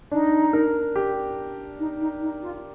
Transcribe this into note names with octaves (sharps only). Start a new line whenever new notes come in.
D4 D#4
A#4
G4
D#4
D#4
D#4
F4